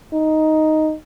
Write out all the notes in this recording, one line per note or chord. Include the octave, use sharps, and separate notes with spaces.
D#4